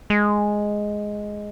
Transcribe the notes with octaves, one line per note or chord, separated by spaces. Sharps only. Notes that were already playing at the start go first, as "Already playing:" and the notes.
G#3